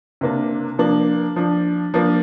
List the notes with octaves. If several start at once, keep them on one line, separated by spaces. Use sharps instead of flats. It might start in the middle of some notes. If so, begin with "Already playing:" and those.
C3 A#3 D4
F3 A#3 D4
F3 D4
F3 A#3 D4